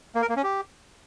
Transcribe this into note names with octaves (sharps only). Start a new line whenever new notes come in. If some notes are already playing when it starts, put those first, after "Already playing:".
A#3
A#4
A#3
C#4
G4